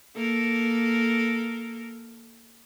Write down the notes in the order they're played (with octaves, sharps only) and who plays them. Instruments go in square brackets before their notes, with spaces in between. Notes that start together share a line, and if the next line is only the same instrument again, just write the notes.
[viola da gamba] A#3 A4 A#4